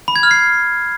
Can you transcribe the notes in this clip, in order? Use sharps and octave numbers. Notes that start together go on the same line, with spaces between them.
B5
G#6
F6
C7